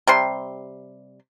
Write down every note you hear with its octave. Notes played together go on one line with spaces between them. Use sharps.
C3 G3 C6